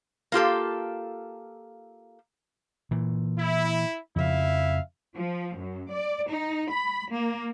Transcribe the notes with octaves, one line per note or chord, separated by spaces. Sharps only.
A#3 F4 G4 A4
A#2 E3
E4
F2 C#3 F3 E4 E5 F5
F3
F#2
D5
D#4
B5
A#3